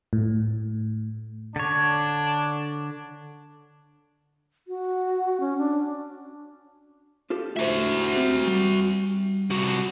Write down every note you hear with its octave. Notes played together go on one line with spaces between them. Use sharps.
A2
D3 D4 C#5
F#4
C#4
D4
F4 G4 A4
A2 D3 F#4 C5 E5
C4 G4
G3
C3 F#4